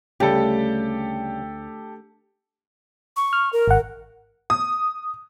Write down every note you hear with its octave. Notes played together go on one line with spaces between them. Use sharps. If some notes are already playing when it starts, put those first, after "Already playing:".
D2 C#3 G3 G4 A4
C#6
F6
A#4
G#1 F#5
D#6